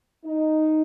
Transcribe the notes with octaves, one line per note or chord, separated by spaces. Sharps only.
D#4